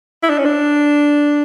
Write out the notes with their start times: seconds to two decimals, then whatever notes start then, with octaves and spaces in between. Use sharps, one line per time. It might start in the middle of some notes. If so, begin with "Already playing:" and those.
0.23 E4
0.30 D4
0.39 C#4
0.45 D4